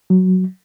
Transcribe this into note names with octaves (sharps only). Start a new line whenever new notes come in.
F#3